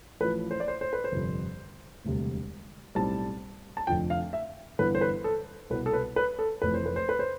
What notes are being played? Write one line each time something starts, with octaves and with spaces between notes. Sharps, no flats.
A1 A2 F3 B4
C5
D5
C5
C5
B4
C5
G1 F2 C3 F3
E1 D2 C3 G3
B1 A2 G3 C4 A5
A5
F1 F2 D3 F3 G5
F5
E5
G1 G2 E3 B3 B4
C5
B4
A4
C2 B2 B3 B4
A4
B4
B4
A4
F1 F2 E3 A3 C4 B4
C5
B4
C5
B4
C5